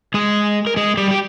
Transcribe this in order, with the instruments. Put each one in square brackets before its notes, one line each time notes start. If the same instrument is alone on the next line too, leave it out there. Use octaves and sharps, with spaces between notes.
[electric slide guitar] G#3 G#4
A#4
G#3 G#4
G3 G4
G4